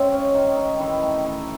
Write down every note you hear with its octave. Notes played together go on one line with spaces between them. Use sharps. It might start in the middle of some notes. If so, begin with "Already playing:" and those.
Already playing: C#3 G#3 C4
C#4
D#3
D#3
D#3 E3 E4
A3
D#3